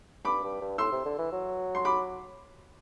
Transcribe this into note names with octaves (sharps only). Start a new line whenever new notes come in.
G2 B5 D6
G2
G2
A2 C6 E6
C3
D3
E3
F#3
C6
B5 D6